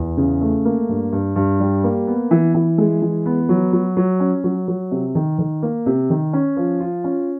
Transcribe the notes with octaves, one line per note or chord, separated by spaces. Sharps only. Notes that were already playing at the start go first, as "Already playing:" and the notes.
Already playing: E2
C#3
A3
A#3
G2
G2
G2
G3
A#3
B3
E3
E3
G#3
E3
B3
F#3
F#3
F#3
C#4
F#3
F#3
C3
D#3
D#3
A#3
C3
D#3
C#4
F3
F4
C#4